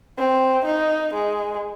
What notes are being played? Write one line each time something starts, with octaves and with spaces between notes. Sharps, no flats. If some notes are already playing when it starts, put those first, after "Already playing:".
C4
D#4
G#3